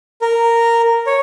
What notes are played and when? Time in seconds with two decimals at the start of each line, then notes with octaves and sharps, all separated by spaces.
0.22 A#4
1.07 C#5